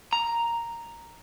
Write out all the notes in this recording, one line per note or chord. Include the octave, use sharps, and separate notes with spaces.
A#5